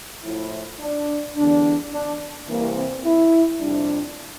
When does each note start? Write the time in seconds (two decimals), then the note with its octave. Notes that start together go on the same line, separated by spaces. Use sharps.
0.23 A2 F3 E4
0.80 D4
1.35 E2 D3 G3 D4
1.92 D4
2.48 C2 C3 E3 A#3
2.76 C4
3.04 E4
3.60 F2 C3 G3 D4